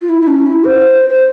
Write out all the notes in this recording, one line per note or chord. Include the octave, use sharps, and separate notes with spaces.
F4
E4
E4
C#4
E4
C5
C5